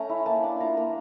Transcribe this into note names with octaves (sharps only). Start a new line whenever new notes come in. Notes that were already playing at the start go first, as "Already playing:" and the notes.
Already playing: A3 C#4 A#5
E4
A#3 A5
D4
F4 A#5
A#3